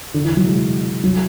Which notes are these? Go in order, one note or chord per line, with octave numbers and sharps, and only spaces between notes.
D3
E3
F#3
G#3
F#3